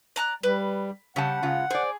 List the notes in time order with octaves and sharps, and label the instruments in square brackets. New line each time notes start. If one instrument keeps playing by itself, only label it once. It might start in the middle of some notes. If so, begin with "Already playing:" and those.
[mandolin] D5 A#5 F#6
[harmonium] G3 [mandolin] B4
[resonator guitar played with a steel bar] C#3 G3 A5 [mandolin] C#4 [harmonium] F#5
[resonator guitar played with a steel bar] C#3 G#3 F4
[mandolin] G#4 [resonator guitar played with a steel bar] C5 D5